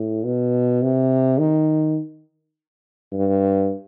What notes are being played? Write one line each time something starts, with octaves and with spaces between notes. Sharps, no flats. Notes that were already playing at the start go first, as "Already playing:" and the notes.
Already playing: A2
B2
C3
D#3
G2